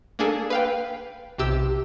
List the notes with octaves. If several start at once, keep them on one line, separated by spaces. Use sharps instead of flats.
A#3 D4 G#4 A4
B4 F5 G5
B1 C3 G4 E6